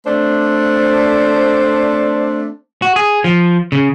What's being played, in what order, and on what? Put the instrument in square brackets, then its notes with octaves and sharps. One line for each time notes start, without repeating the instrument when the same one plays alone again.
[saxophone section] A3 C4 D4 C5 D5
[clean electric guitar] F#4
G#4
F3
C#3